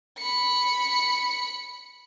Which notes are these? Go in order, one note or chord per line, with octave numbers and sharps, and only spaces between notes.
B5 C#7